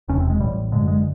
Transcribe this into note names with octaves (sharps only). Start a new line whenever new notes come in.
E1 E2 C3 C#4
C4
G#3
A1 A2 G3
G1 F#2 D3 G#3
G#3